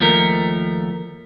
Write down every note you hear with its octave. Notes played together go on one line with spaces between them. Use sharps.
D#2 F3 A3 A#4